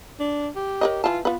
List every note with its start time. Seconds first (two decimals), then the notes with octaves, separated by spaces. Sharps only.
0.20 D4
0.56 G4
0.81 A#4 C#5 D#5
1.04 E3 F4 A5
1.25 B3 F4 B4